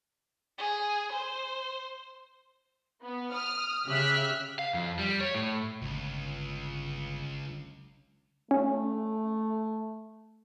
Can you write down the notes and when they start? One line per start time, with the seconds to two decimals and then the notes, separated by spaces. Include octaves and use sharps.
0.58 G#4
1.12 C5
3.04 B3
3.33 D#6 F6
3.88 C#3 G4 E5 F6 F#6 B6
4.59 F5
4.74 F2
4.99 G3
5.21 C#5
5.35 A2
5.82 G1 C#2
8.51 A3 C#4